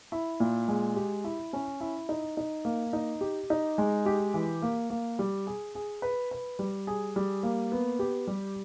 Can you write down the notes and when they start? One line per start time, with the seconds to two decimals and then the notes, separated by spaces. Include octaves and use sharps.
0.12 E4
0.40 A#2
0.68 G#3
0.96 G4
1.24 E4
1.53 C#4
1.81 E4
2.09 D#4
2.37 D#4
2.65 A#3
2.93 D#4
3.21 G4
3.50 D#4
3.78 G#3
4.06 G4
4.34 E3
4.62 A#3
4.90 A#3
5.19 G3
5.47 G#4
5.75 G#4
6.02 B4
6.31 B4
6.59 G3
6.87 G#4
7.16 G3
7.43 A#3
7.72 B3
7.99 G4
8.27 G3